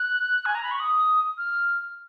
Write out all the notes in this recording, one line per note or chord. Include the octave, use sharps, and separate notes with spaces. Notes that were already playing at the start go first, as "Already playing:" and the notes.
Already playing: F#6
G#5
A#5
B5
C#6
D#6
F6